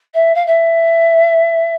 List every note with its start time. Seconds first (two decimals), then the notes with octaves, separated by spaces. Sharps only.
0.14 E5
0.34 F5
0.46 E5